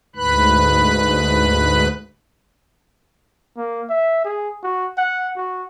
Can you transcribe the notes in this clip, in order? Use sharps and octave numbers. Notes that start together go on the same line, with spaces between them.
D2 G#2 B4 B5 F#6
A#3
E5
G#4
F#4
F#5
F#4